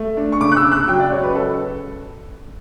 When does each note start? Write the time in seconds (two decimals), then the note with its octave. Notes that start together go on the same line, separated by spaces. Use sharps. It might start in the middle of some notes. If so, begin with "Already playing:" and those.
Already playing: A3
0.17 D4
0.32 C#6
0.40 C#3 D6
0.52 F#6
0.57 E6
0.64 C#3
0.72 F#6
0.88 F#3 G5
1.00 D5
1.12 C#2 C#5
1.23 B4
1.35 C#2 A4